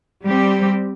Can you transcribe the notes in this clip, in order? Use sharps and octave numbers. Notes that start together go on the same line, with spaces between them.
G3 C4 G4